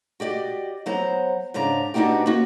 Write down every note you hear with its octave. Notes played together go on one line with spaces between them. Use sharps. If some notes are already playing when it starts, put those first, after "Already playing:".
F#4 G4 D5 D#5
F#3 B3 C5 F#5 A#5
G#2 C#3 D4 A#5
B3 C4 D4 D#4 F#4 G4
A#3 C#4 F#4